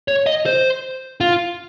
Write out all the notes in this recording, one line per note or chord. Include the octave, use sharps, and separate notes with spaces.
C#5
D#5
C5
F4